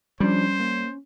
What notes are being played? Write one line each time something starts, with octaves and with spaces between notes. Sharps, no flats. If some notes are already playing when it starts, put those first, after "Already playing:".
F3 G3 C#4 D4 C5
A#3